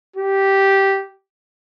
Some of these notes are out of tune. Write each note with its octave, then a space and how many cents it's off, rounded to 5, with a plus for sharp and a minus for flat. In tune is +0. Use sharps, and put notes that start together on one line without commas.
G4 -10